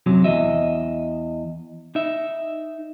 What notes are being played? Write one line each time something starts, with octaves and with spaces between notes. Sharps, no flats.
F#2 C3 F#3
E2 F3 D#5 E5
D#4 E5